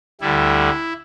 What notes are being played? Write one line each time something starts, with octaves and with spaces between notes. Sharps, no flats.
D2 D3 G3 E4